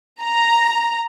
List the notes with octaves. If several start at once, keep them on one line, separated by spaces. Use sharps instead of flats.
A#5